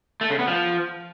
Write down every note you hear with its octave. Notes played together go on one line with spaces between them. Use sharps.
A3
C#3
B3
F3